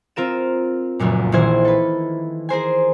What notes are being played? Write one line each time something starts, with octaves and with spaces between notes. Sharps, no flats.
C4 F4 A#4 E7
F1 C#2 F#2 A#2
A#1 D#3 E3 E4 C5 G#6
A4 B4
G#4 A#4 C5 G#5